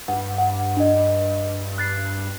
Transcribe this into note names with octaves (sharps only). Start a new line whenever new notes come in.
G2 F#5
F#5
D4 D#5
F#6 A6 C7